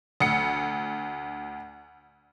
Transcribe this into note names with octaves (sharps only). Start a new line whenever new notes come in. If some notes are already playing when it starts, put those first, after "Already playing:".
D2 C#7